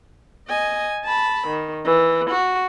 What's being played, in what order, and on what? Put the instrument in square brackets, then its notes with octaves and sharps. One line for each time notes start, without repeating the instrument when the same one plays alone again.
[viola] D#5 G#5
A5 B5
D#3
E3
F#4